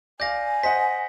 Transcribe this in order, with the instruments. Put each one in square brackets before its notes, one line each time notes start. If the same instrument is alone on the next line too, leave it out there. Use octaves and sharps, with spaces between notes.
[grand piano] D5 F5 [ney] G#5 [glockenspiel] G6 A#6
[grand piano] C5 D#5 F#5 [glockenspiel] B6